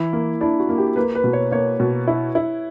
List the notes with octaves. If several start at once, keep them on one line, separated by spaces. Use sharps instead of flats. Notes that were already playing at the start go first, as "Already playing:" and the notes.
Already playing: E3 E4
A#3
D4 E4
F#4
A#3
G4
A#3 B4
B4
B2
C#5
A#3 C#5
B2
E4
E4